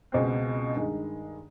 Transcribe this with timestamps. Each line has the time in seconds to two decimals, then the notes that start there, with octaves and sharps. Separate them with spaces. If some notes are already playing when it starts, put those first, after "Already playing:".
0.12 C#2 B2 G#3 C4
0.74 G2 D#3 G#3